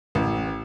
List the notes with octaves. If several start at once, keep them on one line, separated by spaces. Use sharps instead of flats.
A1